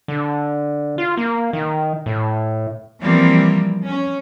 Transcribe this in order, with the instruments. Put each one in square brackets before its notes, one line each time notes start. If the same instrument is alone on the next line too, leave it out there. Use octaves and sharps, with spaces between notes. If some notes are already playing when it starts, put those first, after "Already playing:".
[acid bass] D3
F4
A#3
D#3
A2
[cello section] E3 F3 G3 A#3 C4
C#4